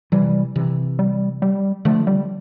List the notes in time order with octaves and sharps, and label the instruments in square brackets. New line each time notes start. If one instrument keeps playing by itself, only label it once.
[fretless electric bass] C3 E3 [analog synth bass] G3
[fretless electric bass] C3 E3
[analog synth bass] G3
G3
[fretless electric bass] D3 F3 [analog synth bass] A3
[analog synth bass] G3